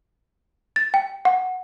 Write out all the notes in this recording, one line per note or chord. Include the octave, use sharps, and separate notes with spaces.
A6
G5
F#5